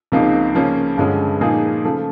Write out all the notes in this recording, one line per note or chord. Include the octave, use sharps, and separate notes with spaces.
C#2 C3 F3 A#3 D#4
C#3 F3 A#3 C#4
G2 D3 F3 G#3 C#4
A#2 F3 A#3 D#4 G#4
C#3 F3 A3